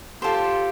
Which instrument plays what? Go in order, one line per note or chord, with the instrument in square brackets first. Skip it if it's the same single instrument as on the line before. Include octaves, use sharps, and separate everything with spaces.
[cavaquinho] F4 A4 C5 F5 [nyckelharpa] G4